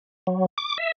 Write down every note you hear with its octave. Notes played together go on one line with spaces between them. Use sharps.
F#3
D6
E5